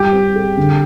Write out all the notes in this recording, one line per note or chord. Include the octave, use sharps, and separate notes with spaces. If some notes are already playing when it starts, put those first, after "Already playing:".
Already playing: G3 F4 G4
C4
G#4
D3